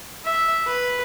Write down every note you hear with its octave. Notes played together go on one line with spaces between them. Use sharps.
E5
B4